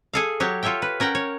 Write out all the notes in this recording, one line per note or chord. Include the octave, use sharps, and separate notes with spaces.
G#4 A4 F5
F#3 G4 C#5 A5
F4 A4 C#5 E5 G5
B4
C#4 A#4 F#5 G5
C#5